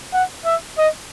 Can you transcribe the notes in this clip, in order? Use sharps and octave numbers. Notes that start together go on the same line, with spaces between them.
F#5
E5
D#5